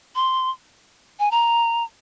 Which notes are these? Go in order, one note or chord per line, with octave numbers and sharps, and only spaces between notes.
C6
G#5
A#5